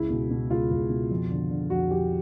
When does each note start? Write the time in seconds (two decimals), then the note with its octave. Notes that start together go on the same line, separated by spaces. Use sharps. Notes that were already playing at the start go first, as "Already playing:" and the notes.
Already playing: C#2 E4
0.10 B2
0.31 B2
0.50 C#2 F4
0.71 C#2
0.90 B2
1.11 F2
1.31 D3
1.51 D3
1.70 F2 F#4
1.90 F2 G4